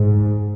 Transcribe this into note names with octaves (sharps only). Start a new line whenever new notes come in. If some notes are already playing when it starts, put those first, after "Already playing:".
Already playing: G#2